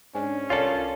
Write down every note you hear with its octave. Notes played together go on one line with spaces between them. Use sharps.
G#2 C#4 D4 G#5
C2 F4 A4 A#4 C#5 D5